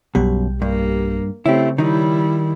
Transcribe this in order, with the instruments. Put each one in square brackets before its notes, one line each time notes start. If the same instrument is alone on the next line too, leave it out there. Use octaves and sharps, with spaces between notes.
[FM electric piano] B1 G3 G4 [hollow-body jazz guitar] F#2 B2
[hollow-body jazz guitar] G2 [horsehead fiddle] A#3
[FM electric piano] C#3 C#5 [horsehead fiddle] A3 C4 [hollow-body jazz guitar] E4 G4
[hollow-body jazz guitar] D#3 D#4 [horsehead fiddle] G3 E4